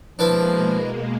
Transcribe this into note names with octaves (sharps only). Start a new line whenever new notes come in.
B2 F3 G#3 A#3 D4 E4 B4